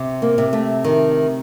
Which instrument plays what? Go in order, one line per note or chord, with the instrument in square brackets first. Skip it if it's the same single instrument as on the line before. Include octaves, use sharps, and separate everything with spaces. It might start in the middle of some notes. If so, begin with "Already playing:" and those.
Already playing: [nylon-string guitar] C3
A#3
C3
A3
D#3